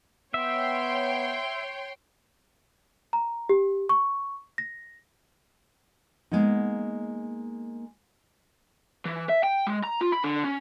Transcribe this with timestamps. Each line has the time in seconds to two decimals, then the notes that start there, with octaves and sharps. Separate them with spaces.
0.34 B3 C#5 E5 G5 C6
3.13 A#5
3.49 G4
3.89 C#6
4.58 A#6
6.31 G#3 A#3 B3 D#4
9.05 E3
9.29 E5
9.43 G5
9.67 G#3
9.84 A#5
10.01 F4
10.12 B5
10.24 D3
10.44 C#4